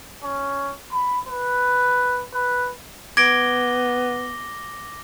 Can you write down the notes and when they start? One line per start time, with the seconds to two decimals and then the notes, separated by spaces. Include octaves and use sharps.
0.23 C#4
0.91 B5
1.28 B4
2.34 B4
3.17 B3 D6 G#6 A#6 D7 G7